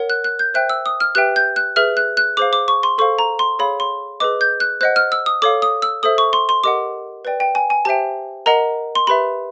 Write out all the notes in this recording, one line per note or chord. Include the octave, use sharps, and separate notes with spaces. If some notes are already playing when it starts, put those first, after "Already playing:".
Already playing: A#4 C#5 F#5
F#6
F#6
G6
C5 E5 G5 F#6
E6
D#6
F6
G4 B4 E5 G5 F#6
G6
F#6
G#4 B4 E5 F6
F#6
F#6
G#4 C5 F5 D6
D6
C#6
C6
A4 C5 F5 C#6
A#5
C6
G#4 C#5 F5 B5
C6
G#4 B4 D#5 D6
G6
F#6
C5 D#5 F#5 F#6
F6
E6
D#6
A4 C#5 F5 D6
D#6
E6
A4 C5 E5 D#6
C#6
C6
C6
G4 A#4 D#5 F#5 D6
B4 D5 G5
G5
G#5
G#5
G4 C5 E5 G5 A5
A#4 D#5 F#5 A#5
C6
G4 B4 E5 B5